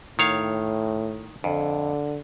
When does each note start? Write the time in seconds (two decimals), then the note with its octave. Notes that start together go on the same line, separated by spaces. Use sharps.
0.19 A2 D#3 C#5 F5
1.44 F2 D3